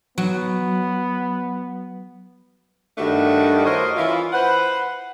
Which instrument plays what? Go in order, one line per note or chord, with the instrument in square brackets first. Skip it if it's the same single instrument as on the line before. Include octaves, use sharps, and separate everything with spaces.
[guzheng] F#3 [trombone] B3
[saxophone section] G2 D#3 G3 A3 D4 F#4
E4 A#4 C5 C#5 D#5
E3 C#4 E4 F4
B4 C5 F#5